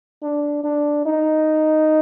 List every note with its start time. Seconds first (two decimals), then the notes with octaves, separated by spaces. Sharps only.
0.23 D4
0.64 D4
1.05 D#4